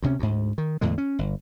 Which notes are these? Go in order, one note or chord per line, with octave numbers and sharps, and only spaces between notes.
D2 C3 C#4
D2 G#2
D#3
E2 A2 D3 G#3
C#4
G1